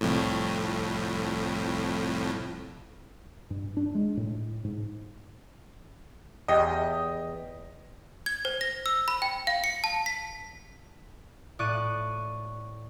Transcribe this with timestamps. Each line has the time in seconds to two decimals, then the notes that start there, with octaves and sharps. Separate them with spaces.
0.01 C2 F2 A2
3.50 G2
3.77 D4
3.95 G#3
4.17 A2
4.64 G#2
6.48 E2 G4 D#5
8.26 G#6
8.45 C5
8.61 A#6
8.86 E6
9.08 B5
9.22 G5
9.47 F5
9.64 C#7
9.84 A5
10.06 B6
11.59 A2 D5 C#6 F#6 D#7